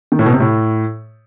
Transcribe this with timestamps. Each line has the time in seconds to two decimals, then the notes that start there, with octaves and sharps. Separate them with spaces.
0.12 D#3
0.19 A2
0.26 B2
0.33 C3
0.40 A2